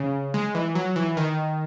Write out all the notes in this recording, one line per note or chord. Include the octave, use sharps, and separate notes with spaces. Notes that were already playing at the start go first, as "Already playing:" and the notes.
Already playing: C#3
G#3
E3
F#3
E3
D#3